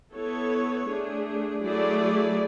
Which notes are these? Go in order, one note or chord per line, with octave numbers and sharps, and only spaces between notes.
B3 E4 A4 C#5
A3 D4 G#4
F#3 A3 E4 G#4 D5